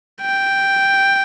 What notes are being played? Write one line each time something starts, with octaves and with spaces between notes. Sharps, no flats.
G5